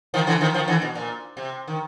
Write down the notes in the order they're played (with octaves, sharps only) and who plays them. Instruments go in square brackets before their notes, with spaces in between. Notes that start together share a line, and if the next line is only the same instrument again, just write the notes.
[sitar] D#3 F3
D3 E3
D#3 F3
D#3 F3
D3 E3
B2
A#2
C3
D#3